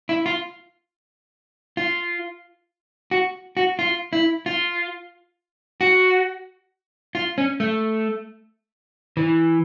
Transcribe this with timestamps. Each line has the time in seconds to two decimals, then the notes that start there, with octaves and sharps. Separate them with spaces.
0.09 E4
0.26 F4
1.77 F4
3.11 F#4
3.57 F#4
3.79 F4
4.13 E4
4.46 F4
5.81 F#4
7.15 F4
7.38 C#4
7.60 A3
9.17 E3